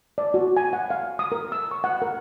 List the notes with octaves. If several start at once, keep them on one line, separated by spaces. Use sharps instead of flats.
D5
F#4
G#5
F#5
F5
D#6
A#4
E6
C#6
F#5
A#4